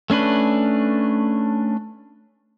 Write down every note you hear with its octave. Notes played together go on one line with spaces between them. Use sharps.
A3 C#4 D4 B4